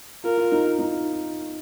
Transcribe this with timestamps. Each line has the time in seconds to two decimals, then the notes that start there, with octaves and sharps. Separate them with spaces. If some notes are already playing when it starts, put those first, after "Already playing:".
0.24 F4 A#4
0.38 F4
0.52 D#4
0.65 F4
0.79 D#4